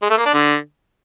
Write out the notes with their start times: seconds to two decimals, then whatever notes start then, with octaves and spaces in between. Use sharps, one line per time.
0.02 G#3
0.10 A3
0.18 A#3
0.26 D4
0.34 D3